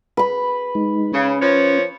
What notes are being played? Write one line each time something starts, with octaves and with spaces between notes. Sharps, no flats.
B4 B5
G#3 D#4
C#3 C#4
F3 B4 C#5